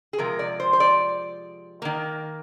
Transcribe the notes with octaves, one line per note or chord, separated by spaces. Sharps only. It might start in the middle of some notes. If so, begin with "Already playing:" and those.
G#4
C3 F3 G#3 A#4
D5
C5
C5
D5
D#3 A#3